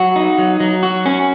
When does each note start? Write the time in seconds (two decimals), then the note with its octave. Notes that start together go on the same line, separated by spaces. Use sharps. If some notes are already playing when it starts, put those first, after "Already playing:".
Already playing: F#3 F#4
0.16 D#4
0.38 F#3
0.60 F#3
0.83 F#4
1.06 C#4